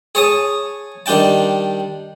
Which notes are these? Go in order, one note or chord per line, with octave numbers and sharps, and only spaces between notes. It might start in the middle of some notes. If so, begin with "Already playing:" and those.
G#4 C#5 A5 D#6
D#3 G3 D4 G5 A5